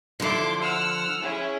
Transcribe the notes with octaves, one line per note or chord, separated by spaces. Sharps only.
D3 F3 E4 C6 D6
F#5 E6 F6
C#4 E4 G#4